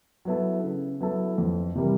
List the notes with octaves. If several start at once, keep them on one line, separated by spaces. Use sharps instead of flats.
F#3 B3 E4 A4
C#3
F#3 B3 E4 A4
F2
C3 E3 G3 A#3